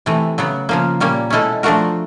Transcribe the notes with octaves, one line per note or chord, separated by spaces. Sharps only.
C3 E3 A3
C#3 F#3 B3
C#3 F3 A#3
A#2 G3 A#3 C#4
B2 G#3 C#4 E4 A4
F3 A3 D4 F#4 A#4